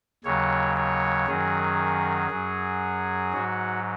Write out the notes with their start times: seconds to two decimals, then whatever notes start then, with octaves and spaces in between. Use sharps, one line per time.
0.24 D#2 C#3 F#3 C#5
0.76 C#5
1.27 F#2 D#3 F#3 G#4
2.30 F#2 F#3
3.33 G#2 F#3 F#4